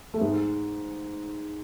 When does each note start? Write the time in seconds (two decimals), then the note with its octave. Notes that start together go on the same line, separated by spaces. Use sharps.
0.14 A3
0.21 G#2 G#3